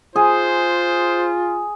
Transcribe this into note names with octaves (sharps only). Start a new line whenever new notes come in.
F4 G#4 C5